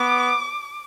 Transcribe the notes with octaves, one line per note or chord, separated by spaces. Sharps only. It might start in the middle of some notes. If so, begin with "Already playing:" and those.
Already playing: B3 D6